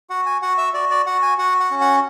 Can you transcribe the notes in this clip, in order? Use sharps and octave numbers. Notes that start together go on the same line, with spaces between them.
F#4 F#5
G#5
F#4 F#5
E5
F#4 D5
D5
F#4 F#5
G#5
F#4 F#5
F#5
C#4
F#5